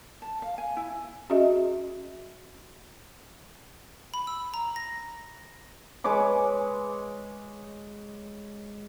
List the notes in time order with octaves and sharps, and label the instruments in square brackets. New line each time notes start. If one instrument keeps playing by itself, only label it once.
[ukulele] A5
F5
G#5
E4
[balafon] C#4 F#4 G#4 D#5 E5
[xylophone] B5
E6
A#5
A#6
[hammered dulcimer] G#3 B4 C#5 D6